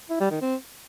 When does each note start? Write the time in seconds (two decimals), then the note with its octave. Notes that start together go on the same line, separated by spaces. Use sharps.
0.10 E4
0.20 G3
0.31 D#3
0.41 C4